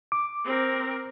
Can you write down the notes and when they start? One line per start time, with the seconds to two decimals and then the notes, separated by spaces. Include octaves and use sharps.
0.12 D6
0.45 C4 A#4